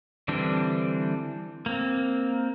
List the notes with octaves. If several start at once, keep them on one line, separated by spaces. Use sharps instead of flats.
D3 E3 G3 C4 D4
A#3 C4